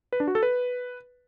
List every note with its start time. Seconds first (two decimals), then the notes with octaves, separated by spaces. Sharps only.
0.13 B4
0.20 D4
0.28 F#4
0.35 A4
0.43 B4